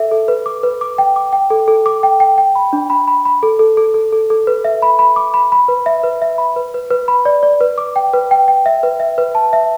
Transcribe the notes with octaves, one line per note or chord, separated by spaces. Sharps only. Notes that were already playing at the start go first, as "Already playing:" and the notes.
Already playing: A4 E5
A4
B4
D6
B4
D6
G5
D6
G5
A4
A4
D6
G5
G5
G5
B5
D4
B5
B5
B5
A4
A4
A4
A4
A4
A4
B4
E5
B5
B5
D6
B5
B5
B4
E5
B4
E5
B5
B4
B4
B4
B5
D5
D5
B4
D6
G5
B4
G5
G5
E5
B4
E5
B4
A5
E5